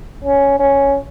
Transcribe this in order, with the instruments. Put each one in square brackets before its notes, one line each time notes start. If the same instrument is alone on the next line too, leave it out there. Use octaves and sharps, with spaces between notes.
[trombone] C#4
C#4